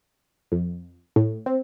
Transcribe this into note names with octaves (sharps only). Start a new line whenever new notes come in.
F2
A2
C4